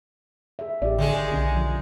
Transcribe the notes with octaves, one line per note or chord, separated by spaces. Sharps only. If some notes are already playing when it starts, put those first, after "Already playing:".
G#4 E5
A1 G4 D5
D3 D#3 G#3 G#4
B1 C#4
F3